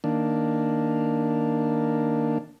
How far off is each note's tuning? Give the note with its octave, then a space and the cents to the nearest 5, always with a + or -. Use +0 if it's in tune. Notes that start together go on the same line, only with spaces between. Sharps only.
D#3 +0 A#3 +0 D4 +0